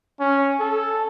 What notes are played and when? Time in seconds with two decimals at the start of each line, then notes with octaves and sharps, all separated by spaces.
0.20 C#4
0.60 A4